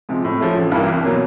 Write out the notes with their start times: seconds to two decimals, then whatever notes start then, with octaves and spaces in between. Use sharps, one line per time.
0.09 C3 F3 G#3
0.25 A2
0.40 F3 A3 C#4
0.56 A1
0.72 G2 E3 G3 A#3
0.87 C2
1.04 B2 F#3 A#3